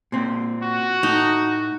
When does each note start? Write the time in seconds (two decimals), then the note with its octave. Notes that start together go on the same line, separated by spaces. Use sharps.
0.12 A#2 C4
0.63 F#4
1.03 A2 D#4